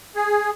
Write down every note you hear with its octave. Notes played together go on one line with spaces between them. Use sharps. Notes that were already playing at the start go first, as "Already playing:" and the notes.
G#4